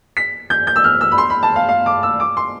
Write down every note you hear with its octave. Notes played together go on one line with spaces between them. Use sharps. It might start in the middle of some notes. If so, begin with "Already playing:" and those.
B6
G6
G6
E6
F6
E6
B5
C6
B5
A5
F5
F5
D6
E6
D6
C6